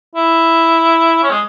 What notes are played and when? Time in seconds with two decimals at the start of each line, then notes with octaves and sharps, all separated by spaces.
0.15 E4
1.23 C#4
1.31 G#3